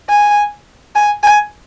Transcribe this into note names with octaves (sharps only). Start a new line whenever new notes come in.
G#5
G#5
G#5